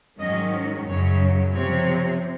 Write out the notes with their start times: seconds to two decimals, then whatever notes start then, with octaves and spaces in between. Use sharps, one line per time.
0.19 G#2 D#3 F#3 C#4 D#5
0.86 F#2 C#3 F#3 C#5
1.54 C3 F3 C4 C#5